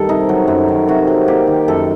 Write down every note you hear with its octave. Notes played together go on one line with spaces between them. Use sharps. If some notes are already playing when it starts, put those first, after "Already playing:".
Already playing: G2 D#3 A4
C3 D#4
F#3
F#2
D#3
C3 F#4
F#3
A#3 G4
D#3
F#2 A4